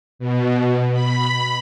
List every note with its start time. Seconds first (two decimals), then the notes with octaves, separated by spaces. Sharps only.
0.19 B2
0.93 B5